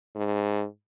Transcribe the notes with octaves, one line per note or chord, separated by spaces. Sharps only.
G#2